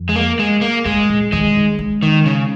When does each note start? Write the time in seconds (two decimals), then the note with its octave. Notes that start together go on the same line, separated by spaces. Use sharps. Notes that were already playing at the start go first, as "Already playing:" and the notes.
Already playing: F2
0.09 G#3
0.16 A#3
0.39 G#3
0.61 A#3
0.85 G#2 G#3
1.09 A#2
1.32 D#3 G#3
1.55 D#3
1.79 G#3
2.03 D#3
2.26 C#3